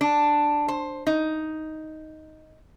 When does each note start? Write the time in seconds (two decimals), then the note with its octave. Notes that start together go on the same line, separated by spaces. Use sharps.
0.01 D4
0.68 C5
1.07 D#4